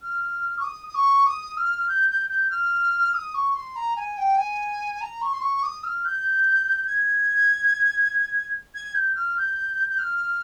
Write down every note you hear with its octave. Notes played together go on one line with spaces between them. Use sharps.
F6
C#6
D#6
D#6
C#6
D#6
F6
G6
G6
G6
F6
D#6
C#6
C6
A#5
G#5
G5
G#5
A#5
C#6
C6
C#6
D#6
F6
G6
G#6
G#6
G6
F6
G6
G6
F6